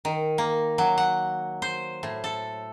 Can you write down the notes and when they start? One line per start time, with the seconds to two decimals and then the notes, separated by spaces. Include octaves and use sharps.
0.05 D#3
0.38 A#3
0.78 F#3
0.98 F#5
1.62 C5
2.03 A2
2.24 A4